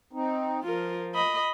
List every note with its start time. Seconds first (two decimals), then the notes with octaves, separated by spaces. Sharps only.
0.13 C4 D#4
0.63 F3 F4 A#4
1.14 D#5 B5